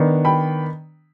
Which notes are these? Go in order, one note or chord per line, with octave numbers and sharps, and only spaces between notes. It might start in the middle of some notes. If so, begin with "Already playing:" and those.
Already playing: D#3 B3 D4
G5 B5